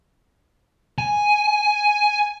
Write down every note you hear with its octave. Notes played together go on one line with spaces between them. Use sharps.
G#5